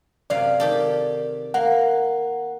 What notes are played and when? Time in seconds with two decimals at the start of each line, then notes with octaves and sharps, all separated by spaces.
0.30 F#2 C3 D5 F5
0.60 D#3 G4 A4
1.54 A#3 F#5